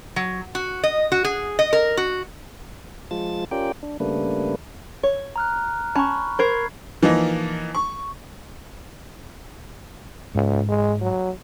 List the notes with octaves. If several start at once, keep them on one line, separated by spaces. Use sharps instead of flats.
F#3
F#4
D#5
F#4
G#4
D#5
A#4
F#4
F3 G#3 F4 A5 A6
C#4 F4 G4 A#4 D5 G5
D4
C#3 G3 A3 A#3 D4 B4
C#5
A#5 F6 F#6
C#4 A5 B5 C#6
A#4 C5 B5 G#6 C7
E3 F3 A#3 D#4
C#6
C#2 G#2
G#3
F#3